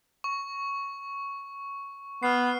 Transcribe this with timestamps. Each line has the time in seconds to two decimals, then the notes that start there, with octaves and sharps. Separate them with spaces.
0.24 C#6
2.23 B3 F6 C7